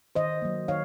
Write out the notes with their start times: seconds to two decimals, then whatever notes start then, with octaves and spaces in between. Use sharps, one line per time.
0.15 D#3 C5 D#5
0.42 F#3 A#3
0.68 D#3 C#5 F5